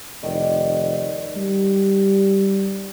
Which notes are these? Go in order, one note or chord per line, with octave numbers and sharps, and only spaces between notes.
F1 D#3 D5
G3